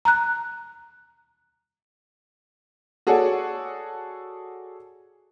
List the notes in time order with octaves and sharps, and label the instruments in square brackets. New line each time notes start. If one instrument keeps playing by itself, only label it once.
[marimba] A#5 F#6
[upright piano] F#4 G#4 A4 C#5 D5 F#5